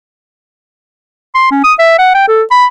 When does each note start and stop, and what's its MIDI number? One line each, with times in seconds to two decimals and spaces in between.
1.35 1.48 84
1.52 1.62 61
1.64 1.73 87
1.79 1.95 76
1.99 2.11 78
2.15 2.26 79
2.28 2.43 69
2.51 2.66 83